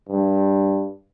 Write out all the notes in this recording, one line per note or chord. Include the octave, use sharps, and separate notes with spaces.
G2